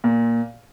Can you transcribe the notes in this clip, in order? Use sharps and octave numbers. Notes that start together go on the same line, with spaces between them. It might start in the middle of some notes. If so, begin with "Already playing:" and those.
A#2